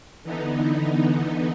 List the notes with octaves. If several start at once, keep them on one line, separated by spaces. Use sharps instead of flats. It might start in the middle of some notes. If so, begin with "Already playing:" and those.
D3 E3 B3 D#4